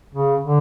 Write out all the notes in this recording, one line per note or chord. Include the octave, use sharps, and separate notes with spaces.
C#3
D3